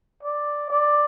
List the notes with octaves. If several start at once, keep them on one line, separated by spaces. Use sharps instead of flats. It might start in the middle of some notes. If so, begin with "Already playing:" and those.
D5
D5